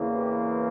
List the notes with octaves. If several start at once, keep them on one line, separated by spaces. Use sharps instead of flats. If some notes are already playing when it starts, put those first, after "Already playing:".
Already playing: E2 C#3 E3 A#3
G4